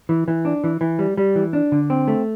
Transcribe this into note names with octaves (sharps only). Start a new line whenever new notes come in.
E3
E3
D4
E3
E3
G3
G3
E3
D4
D3
C4
A3